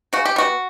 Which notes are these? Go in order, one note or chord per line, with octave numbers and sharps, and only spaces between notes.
C#3 F#4
G4
G3 B3 F#4